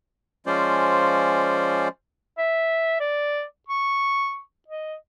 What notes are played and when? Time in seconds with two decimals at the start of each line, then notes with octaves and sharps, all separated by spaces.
0.46 F3 G#3 C#4 F4 C5 D5
2.38 E5
3.00 D5
3.68 C#6
4.68 D#5